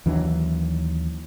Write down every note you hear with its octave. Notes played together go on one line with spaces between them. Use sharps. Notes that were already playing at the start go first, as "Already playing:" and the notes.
D#2 E3 F#3 D4